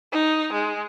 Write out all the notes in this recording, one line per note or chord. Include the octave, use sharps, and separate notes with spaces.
D#4
G#3